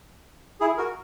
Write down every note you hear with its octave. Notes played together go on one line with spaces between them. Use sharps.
E4 G#4
F#4 A#4